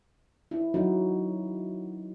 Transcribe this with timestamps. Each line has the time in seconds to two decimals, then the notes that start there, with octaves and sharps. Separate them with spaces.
0.51 E4
0.74 F#3 D#4 F#4